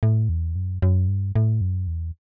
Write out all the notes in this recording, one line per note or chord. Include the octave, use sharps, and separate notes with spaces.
A2
E2
F#2
F#2
G2
A2
F#2
E2